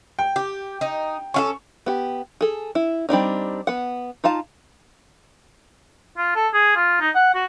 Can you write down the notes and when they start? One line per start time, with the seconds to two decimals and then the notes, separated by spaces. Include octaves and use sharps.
0.19 G5
0.36 G4
0.81 D#4
1.34 C#4 F4 A4 C#6
1.86 B3 G4
2.41 G#4 A4
2.75 E4
3.09 G3 C4 D4 D#4
3.67 B3 F#5
4.24 D#4 F4 F5 A5
6.17 F4
6.36 A4
6.54 G#4
6.76 F4
7.01 D#4
7.15 F#5
7.34 F#4